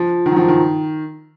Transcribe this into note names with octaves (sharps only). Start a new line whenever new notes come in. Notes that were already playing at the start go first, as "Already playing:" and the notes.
Already playing: F3
D#3
F#3
F3
D#3